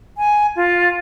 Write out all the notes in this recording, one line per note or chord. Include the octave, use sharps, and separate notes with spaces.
G#5
F4